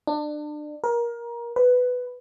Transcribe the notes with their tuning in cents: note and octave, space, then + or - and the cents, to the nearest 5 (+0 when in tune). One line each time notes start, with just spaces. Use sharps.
D4 +30
A#4 +20
B4 +10